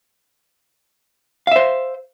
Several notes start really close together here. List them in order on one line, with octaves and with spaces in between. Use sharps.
F5 E5 C5